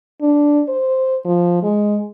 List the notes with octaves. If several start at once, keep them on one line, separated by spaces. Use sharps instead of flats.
D4
C5
F3
G#3